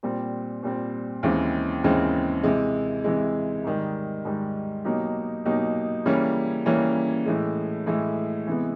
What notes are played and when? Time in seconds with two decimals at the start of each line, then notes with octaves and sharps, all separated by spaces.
0.03 A#2 G3 C4
0.63 A#2 G3 C4
1.23 D#2 C#3 E3 G#3 C4
1.84 D#2 C#3 E3 G#3 C4
2.43 C3 E3 G#3
3.04 C3 E3 G#3
3.64 G#2 D#3 G3
4.25 G#2 D#3 G3
4.85 B2 F#3 A#3 D#4 G4
5.45 B2 F#3 A#3 D#4 G4
6.06 C#3 E3 G3 A#3 C#4
6.66 C#3 E3 G3 A#3 C#4
7.26 A2 E3 G#3
7.87 A2 E3 G#3
8.47 C3 E3 G#3 B3